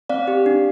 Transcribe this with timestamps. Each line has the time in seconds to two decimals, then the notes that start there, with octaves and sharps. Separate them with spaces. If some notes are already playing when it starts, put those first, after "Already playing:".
0.09 C4 D5 F5
0.28 G4
0.46 D4